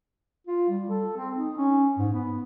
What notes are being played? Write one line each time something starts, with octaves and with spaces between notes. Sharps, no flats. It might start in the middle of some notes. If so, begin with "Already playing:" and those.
F4
G3
A4
C4
D#4
C#4
G#2
B3